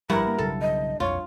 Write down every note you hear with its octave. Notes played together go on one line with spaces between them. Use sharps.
G#1 G2 F3 E4 A#4 F#5
A#3
B1 C#3 F#3 A4
D#5
B1 F2 F4 C#5